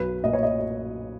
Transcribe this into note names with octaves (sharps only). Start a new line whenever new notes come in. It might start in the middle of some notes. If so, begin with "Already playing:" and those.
Already playing: B1 B4
A#2 D#5
C#5
D#5